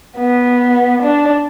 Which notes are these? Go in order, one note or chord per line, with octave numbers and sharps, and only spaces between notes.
B3
D4